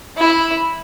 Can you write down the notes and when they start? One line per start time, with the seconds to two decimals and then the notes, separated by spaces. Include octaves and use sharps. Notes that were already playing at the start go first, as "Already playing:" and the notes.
0.17 E4